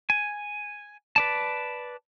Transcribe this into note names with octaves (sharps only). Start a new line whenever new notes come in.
G#5
B4 D5 A5